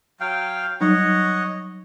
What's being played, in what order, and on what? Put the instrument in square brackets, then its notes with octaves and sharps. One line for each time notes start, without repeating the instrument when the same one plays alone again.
[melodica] F#3 F5 G5
[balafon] F#3 G3 D#4 [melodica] C#5 D#5 F#5